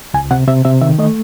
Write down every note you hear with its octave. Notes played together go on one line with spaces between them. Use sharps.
C#2 G#5
C3 F#5
C3 E5
C3 E5
D#3 E5
A3 D#5